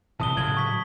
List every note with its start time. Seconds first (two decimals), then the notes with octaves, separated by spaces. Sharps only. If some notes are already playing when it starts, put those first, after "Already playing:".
0.20 F#1 C3 E3 A5 D#6 G7
0.37 A2 C#3 F#3 G#6 F#7
0.57 C#6 B6